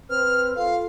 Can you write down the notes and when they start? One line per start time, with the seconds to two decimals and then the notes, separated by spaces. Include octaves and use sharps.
0.10 C4 B4 F6
0.56 F4 A4 F5